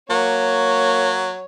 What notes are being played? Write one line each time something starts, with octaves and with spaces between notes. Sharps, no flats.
F#3 A#3 C#5